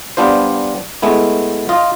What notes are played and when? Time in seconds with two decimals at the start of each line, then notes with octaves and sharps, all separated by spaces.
0.17 G3 B3 D4 F4 C5
1.02 G#3 A3 B3 E4
1.69 F4 D#5